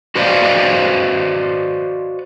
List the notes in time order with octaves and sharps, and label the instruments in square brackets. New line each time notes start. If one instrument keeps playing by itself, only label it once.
[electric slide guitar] F#4 B4 C5 D5 D#5 F5